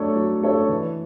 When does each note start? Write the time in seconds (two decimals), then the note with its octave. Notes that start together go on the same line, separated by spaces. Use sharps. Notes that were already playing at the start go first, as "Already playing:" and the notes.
Already playing: F#3 A3 D4 A4 C#5
0.16 F#3
0.42 A3 D4 A4 C#5
0.69 E3